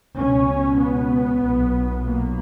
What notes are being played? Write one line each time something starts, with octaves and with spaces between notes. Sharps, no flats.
C#2 B2 C#4
B3
B1 A#2
A#3